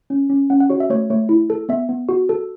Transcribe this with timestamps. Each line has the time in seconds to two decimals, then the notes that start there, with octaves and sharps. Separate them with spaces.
0.10 C#4
0.30 C#4
0.50 C#4 F#5
0.60 F#5
0.70 F#4 C#5
0.80 E5
0.90 A3 C#5
1.10 A3 C#5
1.29 E4
1.50 A4
1.69 B3 E5
1.89 B3
2.09 F#4
2.29 A4